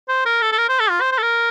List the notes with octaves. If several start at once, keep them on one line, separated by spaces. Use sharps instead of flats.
C5
A#4
A4
A4
A#4
C5
A4
F4
C5
C5
A4
A#4